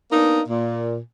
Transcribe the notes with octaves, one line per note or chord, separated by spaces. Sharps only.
A#3 B3 D4 D#4
A#2